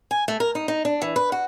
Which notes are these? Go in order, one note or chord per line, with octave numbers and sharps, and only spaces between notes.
G#5
A3
A#4
D#4
D#4
D4
E3
B4
F#4